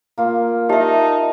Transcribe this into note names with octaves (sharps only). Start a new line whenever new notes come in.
A#3 F4 D6
D#4 G4 E5 A5